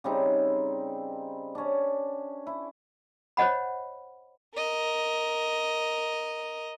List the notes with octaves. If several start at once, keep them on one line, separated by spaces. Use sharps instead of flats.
C#3 G3 C4 D#4
C#4 D4
E4
C5 C#5 D#5 F#5 B5
A#4 D#5